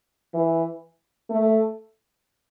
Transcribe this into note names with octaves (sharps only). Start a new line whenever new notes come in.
E3
A3